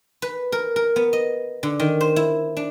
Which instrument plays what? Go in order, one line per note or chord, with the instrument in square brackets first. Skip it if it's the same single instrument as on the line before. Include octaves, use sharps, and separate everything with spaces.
[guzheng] B4
A#4
A#4
B3
D#5
D3
D#3
C5
E4
D4